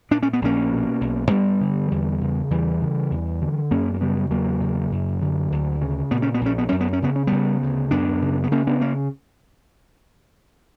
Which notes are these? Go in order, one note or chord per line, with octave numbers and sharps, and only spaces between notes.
A#2 D4
C#4
B3
A#1 A#3 C#4
B2
B1
G2 G3 B3
D3
E2
C#3
E2 E3 G3
C#3
E2
D3
F#2 A#3 C#4
A#3
C#3 G3 B3
E2 F#3 A#3
C#3
F#2
D3
D2
C#3
A#2 B3
C#4
B3
A#1 C#4
B3
F#2 C#4
B3
C#4
C#3 B3
C#4
C#3 G3 B3
D2
F#2 B3 D4
C#3
B3
C#3 A#3 C#4
B3 D4
A#3 C#4